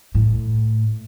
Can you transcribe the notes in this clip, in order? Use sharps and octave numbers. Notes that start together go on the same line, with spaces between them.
A2